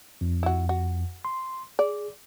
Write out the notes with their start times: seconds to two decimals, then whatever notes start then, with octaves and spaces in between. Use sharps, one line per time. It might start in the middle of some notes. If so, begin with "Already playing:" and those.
0.21 F2
0.43 E4 F#4
0.69 F#4
1.25 C6
1.79 G#4 D5